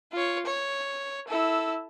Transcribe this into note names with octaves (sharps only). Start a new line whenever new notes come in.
F4 C#5
C#5
E4 A4